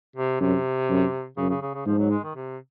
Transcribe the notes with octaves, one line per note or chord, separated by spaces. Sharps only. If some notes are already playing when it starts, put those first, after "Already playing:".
C3
F#2 C3
F#2
F#2 C#3
C#3
C#3
C#3
G#2 F3
F#3
G#3
D#3
C3